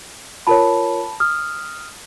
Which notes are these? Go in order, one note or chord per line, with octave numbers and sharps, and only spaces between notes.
F4 A#4 C#5 A5 B5
D#6 F6